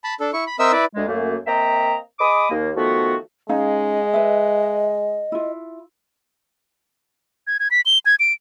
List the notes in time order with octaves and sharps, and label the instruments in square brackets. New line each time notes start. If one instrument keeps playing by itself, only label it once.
[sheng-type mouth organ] A5 B5
D4 A4
E4 C#6
B5
C4 A#4 D#5 E5 E6
E4 B4 D5
[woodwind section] D2 G#3
F#2 A3 A#3
A#3 C4 D#5 E5 G5 A#5
G#4 D#5 B5 D6 D#6
D#2 A#3
D#3 F3 A3 B3 F#4
[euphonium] G#3 [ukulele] C#4 D#4 F5 [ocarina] D#5
[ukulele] B4 E5
E4 F4
[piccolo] G#6
G#6
B6
G7
G#6
D7